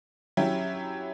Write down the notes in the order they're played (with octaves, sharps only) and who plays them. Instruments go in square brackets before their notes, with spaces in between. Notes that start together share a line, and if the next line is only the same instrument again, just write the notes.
[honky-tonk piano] F#3 C#4 E4 G4